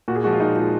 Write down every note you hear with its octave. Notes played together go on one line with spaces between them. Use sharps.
A#2 F#4
G#4
F3 G#3 F#4
F4
A#2 D#4
F3 G#3